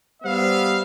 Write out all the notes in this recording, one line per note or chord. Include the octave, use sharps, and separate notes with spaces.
G3 B3 C5 E5 F5